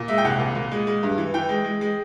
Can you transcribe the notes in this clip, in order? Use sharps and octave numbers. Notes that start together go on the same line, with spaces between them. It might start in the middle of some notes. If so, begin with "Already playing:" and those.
Already playing: A#2
G#3 E5
G5
C2 F#5
A#2
A#2
G#3
G#3
G2
E3
E3 G5
G#3
G#3
G#3